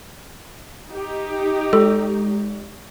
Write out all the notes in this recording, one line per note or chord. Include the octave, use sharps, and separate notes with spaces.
D#4 G4
G#3 A4